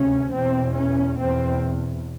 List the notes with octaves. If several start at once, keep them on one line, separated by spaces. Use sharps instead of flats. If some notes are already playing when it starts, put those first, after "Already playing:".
Already playing: D2 C3 C#4
E2 B2 C4
C#4
E2 B2 C4